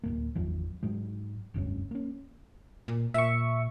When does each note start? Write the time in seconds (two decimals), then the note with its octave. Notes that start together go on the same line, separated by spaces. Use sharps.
0.03 D1 D#2 A#3
0.35 G#1 E2 F3 F#3
0.83 G#2 F#3 G#3
1.54 F1 C#2 G2 C#4
1.91 A#3 C#4
2.88 A#2
3.14 A#2 E5 C#6